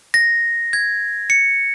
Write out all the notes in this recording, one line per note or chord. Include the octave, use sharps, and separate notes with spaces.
A#6
G#6
C#7